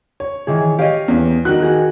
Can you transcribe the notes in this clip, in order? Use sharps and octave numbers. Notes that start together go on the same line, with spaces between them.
C#5
D#3 E3 G#4
G4 C#5 D#5 F5
E2
D#3 F#4 F#6
F#4 G#4